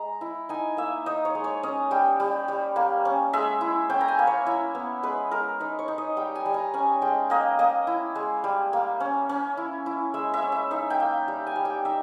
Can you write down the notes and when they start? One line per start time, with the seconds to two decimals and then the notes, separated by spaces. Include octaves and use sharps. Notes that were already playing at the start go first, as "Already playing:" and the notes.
Already playing: G#3 A#5
0.21 E4
0.49 D#4 G#5
0.77 A#3 E5
1.06 D#4 D#5
1.25 C#5
1.35 G#3
1.44 C#5
1.63 C#4 D#5
1.91 G3 G5
2.20 G3
2.48 G3
2.76 A#3
3.05 C#4
3.33 G#3 E5
3.61 E4
3.90 C#4 G5
4.01 A#5
4.08 G#5
4.19 A#3
4.27 C#5
4.46 E4 E5
4.75 B3
5.03 G#3 B4
5.31 G#3 A#4
5.60 D#4 B4
5.79 C#5
5.88 D#4
5.98 D#5
6.17 G3 G5
6.36 G#5
6.46 G3
6.54 A#5
6.74 C#4 G#5
7.01 G#3 G5
7.30 A#3 D#5
7.59 A#3 D#5
7.87 E4
8.16 G#3
8.44 G3
8.73 A#3
9.00 C#4
9.29 C#4
9.57 E4
9.86 E4
10.14 G#3 E5
10.34 E5
10.42 C#4
10.52 E5
10.71 D#4 E5
10.90 G5
11.00 A#3
11.28 G3
11.47 G#5
11.56 G3
11.65 G5
11.85 D#4 E5